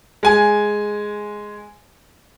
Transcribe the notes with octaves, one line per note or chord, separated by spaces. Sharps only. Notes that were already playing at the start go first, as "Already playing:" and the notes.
G#3 G#5